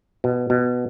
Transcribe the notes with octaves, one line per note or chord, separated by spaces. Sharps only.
B2
B2